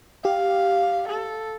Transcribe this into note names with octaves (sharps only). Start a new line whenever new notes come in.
G4 F5
A4